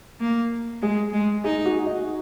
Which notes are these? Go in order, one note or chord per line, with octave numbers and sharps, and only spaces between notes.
A#3
G#3 G#4
G#3
D#4 G#4
F#4
D#4